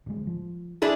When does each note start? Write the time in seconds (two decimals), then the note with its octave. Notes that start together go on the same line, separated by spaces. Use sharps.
0.06 D1 G#3
0.27 F3
0.82 D4 E4 G#4